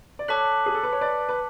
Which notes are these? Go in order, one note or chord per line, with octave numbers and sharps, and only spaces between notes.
D5
A4 C#5 A5 D6 F#6 B6 F#7
G#4
A4
B4
C#5
B4 D5
B4